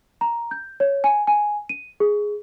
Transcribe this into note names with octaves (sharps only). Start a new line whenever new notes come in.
A#5
G6
C#5
G#5
G#5
D#7
G#4